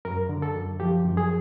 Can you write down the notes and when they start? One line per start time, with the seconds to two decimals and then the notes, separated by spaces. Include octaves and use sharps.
0.05 F#2 A#4
0.29 D3
0.42 A4
0.55 F#2
0.80 F3 G4
1.05 F#2
1.17 G#4